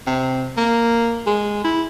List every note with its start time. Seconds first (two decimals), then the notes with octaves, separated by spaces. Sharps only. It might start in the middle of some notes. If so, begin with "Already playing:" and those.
0.07 C3
0.57 A#3
1.27 G#3
1.64 E4